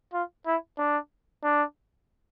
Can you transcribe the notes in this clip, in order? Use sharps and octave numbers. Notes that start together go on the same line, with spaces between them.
F4
E4
D4
D4